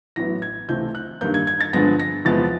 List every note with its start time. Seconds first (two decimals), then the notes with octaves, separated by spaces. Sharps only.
0.16 A1 A2 F#3 B3 A#6
0.42 G#6
0.68 C#2 C3 E3 A3 G6
0.95 F#6
1.21 G2 D#3 G3 A#3 G6
1.34 G#6
1.47 G#6
1.61 A6
1.73 G2 D3 F3 G#3 B3 A#6
2.00 A#6
2.25 E2 C3 F3 G#3 B3 A6